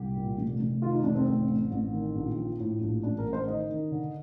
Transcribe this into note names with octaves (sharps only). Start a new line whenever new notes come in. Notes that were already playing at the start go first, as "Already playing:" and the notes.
Already playing: C2 G4
A#2
F1
F1
D#3 F4
D#4
F1 D4
C4
A1 C4
A1
A1
D#3
A#1
F3
A2
A#1
A1 D4
A#4
A1
C5
D#3 D#5
D#3
D3